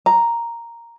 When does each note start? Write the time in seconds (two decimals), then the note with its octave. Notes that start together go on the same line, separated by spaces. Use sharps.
0.06 A#5